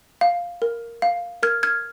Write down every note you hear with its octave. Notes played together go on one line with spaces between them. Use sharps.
F5
A#4
F5
A#4 F6 G#6
F6 G#6